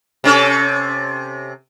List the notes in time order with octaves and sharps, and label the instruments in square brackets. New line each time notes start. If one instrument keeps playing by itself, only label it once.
[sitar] C3 C#4 A4